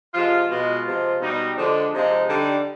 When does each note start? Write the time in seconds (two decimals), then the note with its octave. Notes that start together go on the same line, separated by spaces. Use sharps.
0.14 C3 F3 G#3 F4
0.50 B2 G#3 F4
0.86 C3 F3 G#3
1.21 B2 G3 D#4
1.57 D3 F3 G#3 D4
1.93 C3 F3 G#3 D#4
2.28 D3 G3